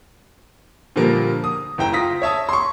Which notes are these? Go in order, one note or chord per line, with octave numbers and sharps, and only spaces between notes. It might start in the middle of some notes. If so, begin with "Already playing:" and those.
A#2 D3 F3 G3 A#3
D#6
F#1 E4 G5 A#5
F4 D#6 A#6 B6
C#5 E5 A5 D#6
C6 C#6